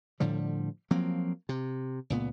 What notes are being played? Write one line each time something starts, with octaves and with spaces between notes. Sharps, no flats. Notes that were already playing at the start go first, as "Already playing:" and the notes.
A2 D3 F3 G3
F3 F#3 A#3 C4
C3
C#2 A#2 B3